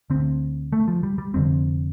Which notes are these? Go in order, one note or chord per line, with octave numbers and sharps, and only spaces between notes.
D2 D3 C4
A3
F3
G3
G3
F1 F2 D3 C4